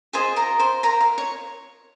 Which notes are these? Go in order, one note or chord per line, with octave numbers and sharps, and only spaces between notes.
F4 G#4 C5 D#5 G#5
A#4 A#5
C5 C6
A#4 A#5
F5
C#5 C#6